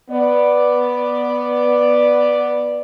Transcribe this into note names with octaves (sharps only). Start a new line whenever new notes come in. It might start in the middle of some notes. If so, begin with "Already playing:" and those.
B3 D5